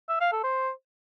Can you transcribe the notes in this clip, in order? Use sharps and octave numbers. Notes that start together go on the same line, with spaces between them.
E5
F5
A4
C5